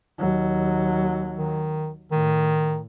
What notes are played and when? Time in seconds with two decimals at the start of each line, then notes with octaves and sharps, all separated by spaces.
0.19 D#2 F#3
1.38 D#3
2.11 A2 D#3